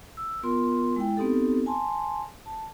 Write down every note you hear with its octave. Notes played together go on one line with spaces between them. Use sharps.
E6
B3 F4 A#4 C6
G#3 E4 G5
B3 C4 D#4 G4 A4
G#5 A5 C6
A5